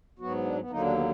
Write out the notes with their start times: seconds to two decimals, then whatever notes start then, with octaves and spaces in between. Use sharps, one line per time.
0.19 G#2 F#3 B3 F#4
0.44 D4
0.58 B3
0.70 D#2 D3 F#3 A#3 D#4
0.82 D4
0.92 B3